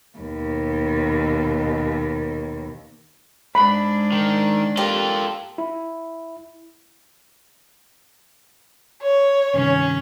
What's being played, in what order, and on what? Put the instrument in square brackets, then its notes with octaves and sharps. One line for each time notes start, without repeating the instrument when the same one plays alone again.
[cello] D#2 B2
[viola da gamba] G#2 D4 [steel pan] B5
[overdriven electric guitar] D#3
[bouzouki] A#3 C4 G4 [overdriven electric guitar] F4 A4
[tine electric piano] E4
[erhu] C#5
[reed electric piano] G2 C3 D#3 [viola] C#4